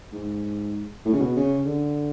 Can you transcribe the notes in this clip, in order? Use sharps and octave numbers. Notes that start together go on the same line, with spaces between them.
G#2
A2
C#3
B2
C#3
D3